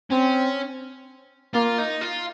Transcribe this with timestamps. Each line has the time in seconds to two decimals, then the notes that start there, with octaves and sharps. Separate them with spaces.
0.11 C4 C#4
1.54 A#3 F4
1.78 D#4
2.01 F4